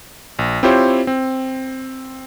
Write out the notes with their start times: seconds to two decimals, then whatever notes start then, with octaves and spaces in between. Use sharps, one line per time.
0.39 A#1
0.63 C4 E4 F4 G4 C5 C#5
1.07 C4